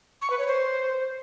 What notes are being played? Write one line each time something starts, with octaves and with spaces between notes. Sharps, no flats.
C#6
B4
C#5
C5